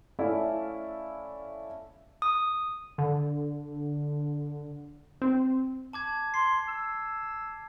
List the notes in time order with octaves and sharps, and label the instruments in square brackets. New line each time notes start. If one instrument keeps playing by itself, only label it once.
[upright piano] A3 C#4 E4 D5 F5 F#5
[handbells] D#6
[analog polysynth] D3
C4
[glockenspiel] A5 D6 G#6
[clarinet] C6 [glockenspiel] C7
[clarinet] E6